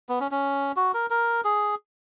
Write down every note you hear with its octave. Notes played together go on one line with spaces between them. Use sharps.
B3
C#4
C#4
F#4
A#4
A#4
G#4